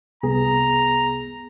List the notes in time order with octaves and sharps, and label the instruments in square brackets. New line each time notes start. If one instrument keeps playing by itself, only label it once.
[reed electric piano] C2 B3 G#4 [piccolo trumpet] A#5